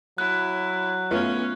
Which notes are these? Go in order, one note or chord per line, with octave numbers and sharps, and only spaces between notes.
F#3 E4 F#6
A3 B3 C#4 F4